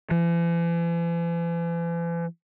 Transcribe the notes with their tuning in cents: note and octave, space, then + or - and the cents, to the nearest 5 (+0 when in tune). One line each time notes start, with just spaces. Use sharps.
E3 +45